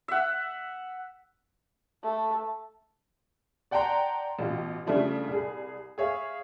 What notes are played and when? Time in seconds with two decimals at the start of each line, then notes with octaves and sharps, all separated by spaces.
0.08 E5 F#5
2.03 A3
3.71 D5 F#5 G5 A5 A#5 C6
4.39 A1 B2 F4
4.87 C#3 F3 G3 A3 D4 E4
5.28 C2 G#4
5.98 G#4 C#5 E5 F5